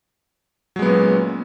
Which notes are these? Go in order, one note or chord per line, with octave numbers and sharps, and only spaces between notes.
A#2 F#3 G#3 B3 C#4